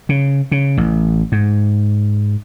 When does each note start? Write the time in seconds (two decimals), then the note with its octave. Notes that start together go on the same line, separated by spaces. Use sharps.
0.09 C#3
0.52 C#3
0.78 A1
1.32 G#2